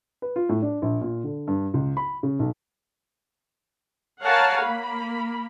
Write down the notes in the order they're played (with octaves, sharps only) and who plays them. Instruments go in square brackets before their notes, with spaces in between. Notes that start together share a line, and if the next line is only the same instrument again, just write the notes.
[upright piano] B4
F4
A2
D4
A#1
A#2
D3
G2
C#2
B5
C#3
B1
[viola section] A#4 C#5 F5 F#5 G#5 A5
A#3 B5